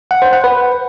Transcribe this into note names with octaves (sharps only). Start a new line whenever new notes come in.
F#5
C5
F#5
B4